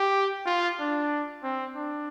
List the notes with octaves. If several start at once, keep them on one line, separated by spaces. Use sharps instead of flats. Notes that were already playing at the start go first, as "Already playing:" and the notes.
Already playing: G4
F4
D4
C4
D4